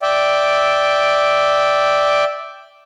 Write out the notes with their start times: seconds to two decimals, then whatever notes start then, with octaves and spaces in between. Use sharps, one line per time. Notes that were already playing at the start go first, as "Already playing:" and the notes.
0.02 D5 E5 G5